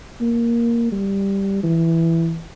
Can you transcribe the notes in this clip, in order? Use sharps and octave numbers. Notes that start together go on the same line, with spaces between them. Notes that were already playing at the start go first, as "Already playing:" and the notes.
A#3
G3
E3